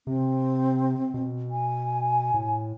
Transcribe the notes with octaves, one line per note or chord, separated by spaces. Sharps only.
C3 C4
B2
G#5
A2